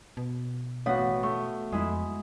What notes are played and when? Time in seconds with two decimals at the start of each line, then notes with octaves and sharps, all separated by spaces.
0.17 B2
0.86 A1 B3 F#4 C#5 F5 F#5
1.23 A3 C#6
1.72 F2 G#3 E4